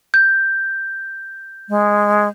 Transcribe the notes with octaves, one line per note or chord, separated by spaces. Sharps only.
G6
G#3